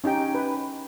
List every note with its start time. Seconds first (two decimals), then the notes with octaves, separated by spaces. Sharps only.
0.04 C#4 D#4 G4 G5
0.35 B4